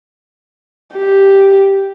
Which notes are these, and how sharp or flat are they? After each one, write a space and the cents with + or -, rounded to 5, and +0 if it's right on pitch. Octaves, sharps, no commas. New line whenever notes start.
G4 +0